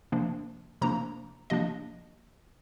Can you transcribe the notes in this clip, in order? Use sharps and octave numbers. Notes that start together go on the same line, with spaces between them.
C3 F3 A#3 D4
C3 F3 A#3 D4 A#5
C3 F3 A#3 D4 D#5